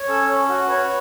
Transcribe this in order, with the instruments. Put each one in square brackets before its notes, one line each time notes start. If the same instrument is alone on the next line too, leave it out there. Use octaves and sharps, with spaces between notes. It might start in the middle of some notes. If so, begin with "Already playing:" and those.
Already playing: [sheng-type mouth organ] C#5
[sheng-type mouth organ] C#4 [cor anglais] A4
[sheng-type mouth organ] C#4
F#4
[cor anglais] B4 [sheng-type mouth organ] C#5